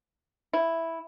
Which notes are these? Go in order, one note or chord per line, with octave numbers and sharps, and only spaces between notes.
E4